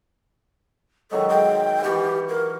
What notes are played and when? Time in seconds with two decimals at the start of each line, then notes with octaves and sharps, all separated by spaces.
1.11 D#3 F#3 G#3 A4
1.29 G4 G5
1.84 E3 F#4 G4
2.29 A#4